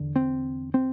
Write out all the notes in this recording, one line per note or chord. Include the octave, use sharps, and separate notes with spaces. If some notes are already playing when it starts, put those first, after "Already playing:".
Already playing: E2 D3
C4
C4